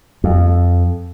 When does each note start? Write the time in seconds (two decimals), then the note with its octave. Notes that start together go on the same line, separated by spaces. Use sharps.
0.24 F2